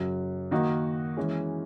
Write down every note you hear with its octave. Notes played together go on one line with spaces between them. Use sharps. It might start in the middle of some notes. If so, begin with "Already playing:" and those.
Already playing: F#2 C#3 F#3
D#3 A#3 D#4 F#4
E3 G#3 C#4